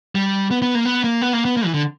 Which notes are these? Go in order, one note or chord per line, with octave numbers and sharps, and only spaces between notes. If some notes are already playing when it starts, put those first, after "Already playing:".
G3
B3
B3
A#3
B3
A#3
B3
A#3
B3
A#3
E3
D3